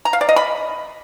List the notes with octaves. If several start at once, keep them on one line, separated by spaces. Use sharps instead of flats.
A#5
F5
D5
D#5
B5